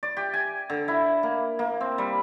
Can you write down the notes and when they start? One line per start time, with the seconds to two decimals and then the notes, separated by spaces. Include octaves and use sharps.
0.03 D5
0.17 G4
0.33 G#5
0.70 D3
0.88 E4
1.23 A#3
1.59 A#3
1.81 C4
1.98 G3